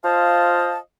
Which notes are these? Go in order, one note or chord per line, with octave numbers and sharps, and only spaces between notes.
F4 C5 D#5 F5 A5